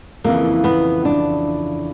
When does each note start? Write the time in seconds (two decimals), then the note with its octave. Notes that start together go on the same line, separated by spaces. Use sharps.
0.24 F2 C#3 E3 A#3
0.64 B3
1.05 D4